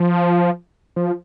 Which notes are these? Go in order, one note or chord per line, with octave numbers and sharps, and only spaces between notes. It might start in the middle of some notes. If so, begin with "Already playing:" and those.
Already playing: F3
F3